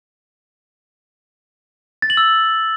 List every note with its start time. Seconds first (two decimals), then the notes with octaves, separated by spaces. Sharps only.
2.02 A6
2.10 F#7
2.17 E6